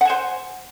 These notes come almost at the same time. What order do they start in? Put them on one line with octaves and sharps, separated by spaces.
F#5 G#5 C5